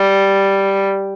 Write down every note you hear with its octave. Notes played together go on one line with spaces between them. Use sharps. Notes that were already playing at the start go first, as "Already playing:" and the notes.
Already playing: G3